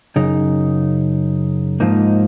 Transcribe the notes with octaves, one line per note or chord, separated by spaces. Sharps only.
F#2 C#3 D#4
G#2 F3 A#3 D#4